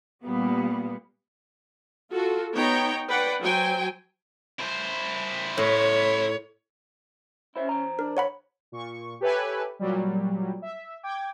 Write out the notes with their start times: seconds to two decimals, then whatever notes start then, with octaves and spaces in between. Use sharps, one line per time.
0.24 A#2 G3 A#3 B3
2.11 F4 F#4 A4
2.54 B3 D#4 C#5 G5 A#5
3.09 B4 D5 F#5 G5
3.41 F#3 C5 G5 G#5
4.59 E4 C5
5.58 A2 C#5
7.56 C#4 E4 C5 E5
7.69 E3 C5 A#5
7.99 D4 A#4
8.17 C#5 F#5 B5
8.72 A#2 C#6
9.21 G4 A4 B4 C#5 E5 G#5
9.79 A#2 F#3 G3
10.62 E5
11.03 G5 D6 G#6